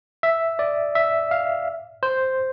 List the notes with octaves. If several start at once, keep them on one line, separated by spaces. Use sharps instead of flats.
E5
D5
E5
F5
C5